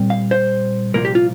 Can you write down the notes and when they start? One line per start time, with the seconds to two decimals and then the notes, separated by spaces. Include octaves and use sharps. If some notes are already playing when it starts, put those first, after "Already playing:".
Already playing: A#2 G3 C4
0.10 F5
0.31 C5
0.94 C2 A#2 F3 A#4
1.05 G4
1.15 F4